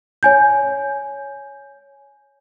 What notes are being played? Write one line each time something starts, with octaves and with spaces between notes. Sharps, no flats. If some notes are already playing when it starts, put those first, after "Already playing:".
C#5 G#5 G6